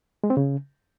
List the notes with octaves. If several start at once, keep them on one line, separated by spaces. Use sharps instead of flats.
G#3
C4
C#3